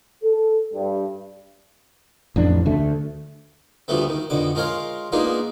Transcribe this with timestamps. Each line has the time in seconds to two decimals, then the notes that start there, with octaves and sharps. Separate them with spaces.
0.23 A4
0.74 G2
2.36 A1 F2 D4
2.66 D2 D3 A3
3.88 D2 F3 G3 A3 B3
4.09 D#3
4.30 F2 B2 D3 D6
4.55 G#3 F4 A#4 C5 C#5 F5
5.12 G#3 A#3 B3 D4 D#4 F4